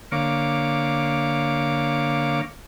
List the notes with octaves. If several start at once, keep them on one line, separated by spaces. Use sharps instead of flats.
D3 A#3 C#5 F5 D6